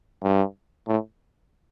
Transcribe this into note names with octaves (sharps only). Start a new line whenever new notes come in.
G2
A2